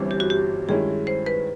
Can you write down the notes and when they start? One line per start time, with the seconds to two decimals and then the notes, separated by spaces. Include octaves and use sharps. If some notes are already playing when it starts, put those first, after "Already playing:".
Already playing: G1 G2 E3 G3 C4
0.11 G4
0.20 F#4
0.30 G4
0.69 G2 D#3 G#3 C#4 E4 G#4
1.07 C5
1.26 B4